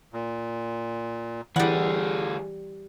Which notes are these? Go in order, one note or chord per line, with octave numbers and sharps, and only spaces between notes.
A#2
D2 D3 E3 G3 G#4 F#5